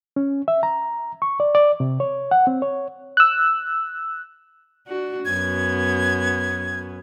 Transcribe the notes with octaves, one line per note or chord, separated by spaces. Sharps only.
C#4
E5
A#5
C#6
D5
D5
C3
C#5
F#5
C4
C#5
E6 F#6
D4 F#4
F#2 B3 G#6